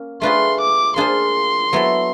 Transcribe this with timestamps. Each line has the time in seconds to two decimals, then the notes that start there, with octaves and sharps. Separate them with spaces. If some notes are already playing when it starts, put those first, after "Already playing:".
Already playing: A#3 C#4
0.21 A3 D4 F4 G#4 B4 C6
0.61 D6
0.96 A#3 D4 F4 G#4 C5 C6
1.73 F#3 B3 E4 A4